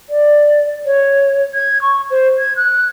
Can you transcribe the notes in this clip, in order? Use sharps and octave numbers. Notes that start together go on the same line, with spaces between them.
D5
C#5
G#6
C#6
C5
G#6
F#6